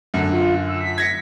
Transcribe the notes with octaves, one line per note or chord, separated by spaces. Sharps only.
F#2 D3
F4
E6
B6
G#6 A#6 C#7